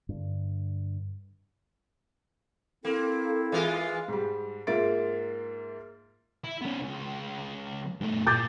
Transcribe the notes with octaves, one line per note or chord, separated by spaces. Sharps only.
G2 D3
A#3 C4 E4 A4
E3 G#3 F4
G#2 G3
G#2 A#3 F4 E5 A6 D7
E4
B3 C#4
C#2
G2 A3
A#2 D6 G6 A6